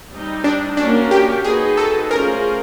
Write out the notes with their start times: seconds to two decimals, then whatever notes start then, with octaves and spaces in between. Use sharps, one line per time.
0.10 G3 C4 D#4
0.44 D4
0.77 A#3 C#4 D4 F#4 A#4
1.11 G4
1.44 C4 D#4 F#4 G#4 B4
1.77 A4
2.11 A3 C#4 F4 G#4 A#4 C5